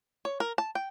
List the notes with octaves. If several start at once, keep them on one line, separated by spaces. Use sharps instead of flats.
C#5
A#4
A5
G5